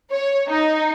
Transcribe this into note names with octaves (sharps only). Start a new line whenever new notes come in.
C#5
D#4